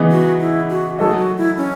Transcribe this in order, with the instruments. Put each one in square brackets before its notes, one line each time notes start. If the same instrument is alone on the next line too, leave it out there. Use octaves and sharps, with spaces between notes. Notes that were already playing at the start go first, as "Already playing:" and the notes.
Already playing: [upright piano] C#3 E3 B3 D#4
[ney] F#4
E4
F#4
[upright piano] F#3 A3 D#4 A4 D#5 [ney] G#4
[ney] F#4
E4
C#4